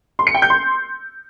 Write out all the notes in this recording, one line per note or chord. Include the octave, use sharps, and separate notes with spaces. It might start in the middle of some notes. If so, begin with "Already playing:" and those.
C6
C#7
G5
G6
C6